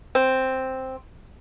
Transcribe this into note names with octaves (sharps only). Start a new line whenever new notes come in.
C4